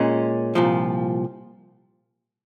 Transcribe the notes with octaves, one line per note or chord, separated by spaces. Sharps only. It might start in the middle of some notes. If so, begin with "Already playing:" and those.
Already playing: A#2 G#3 C#4
C2 A#2 F3